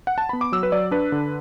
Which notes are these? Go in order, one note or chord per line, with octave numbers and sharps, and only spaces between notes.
F#5
A5
B3 B5
D6
F#3 E6
B4
F#3 D5
D4 B4
D3